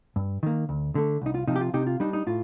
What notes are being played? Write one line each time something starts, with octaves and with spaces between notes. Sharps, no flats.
G2
D#3 A#3
D2
D3 A3
C2 D#4
F4
C3 F3 D#4
G4
F4
C3 D#4 G4
F4
G3 D4 D#4
D#4
A2 F4